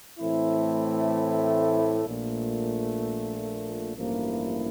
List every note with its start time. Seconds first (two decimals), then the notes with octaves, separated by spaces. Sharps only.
0.19 A2 E3 A3 C4 E4
2.07 A#1 A#2 A3
3.95 A1 G2 F3 A#3 E4